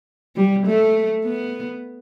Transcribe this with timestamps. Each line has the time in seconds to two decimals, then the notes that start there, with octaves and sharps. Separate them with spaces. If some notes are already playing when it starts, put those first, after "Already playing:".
0.36 G3
0.66 A3
1.24 B3